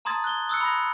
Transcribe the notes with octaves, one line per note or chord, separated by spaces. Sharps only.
A5 A#5 C6 D#6 G#6 A6
F#6 G#6 G7
D#6 E6 F#6 C#7
B5 G#6 A#6